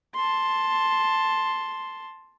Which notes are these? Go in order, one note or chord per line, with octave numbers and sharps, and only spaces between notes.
A5 C6